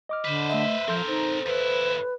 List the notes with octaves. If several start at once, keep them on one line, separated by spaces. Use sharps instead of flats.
D#5 D6 F6
D3 B4 C5
A3 D#5 E5
F3 C4 A4 A#4 C6 G6
D#4 C5
D#2 E4 B4